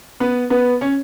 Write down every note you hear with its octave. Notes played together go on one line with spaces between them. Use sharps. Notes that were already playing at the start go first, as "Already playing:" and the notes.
B3 B4
B3 B4
C#4 C#5